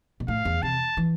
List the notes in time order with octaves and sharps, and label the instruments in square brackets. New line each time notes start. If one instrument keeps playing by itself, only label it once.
[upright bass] B2
[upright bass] A2 [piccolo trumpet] F5
[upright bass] E2
[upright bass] C3 [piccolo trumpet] A5
[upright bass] E3